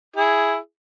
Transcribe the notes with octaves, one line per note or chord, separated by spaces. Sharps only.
E4 G#4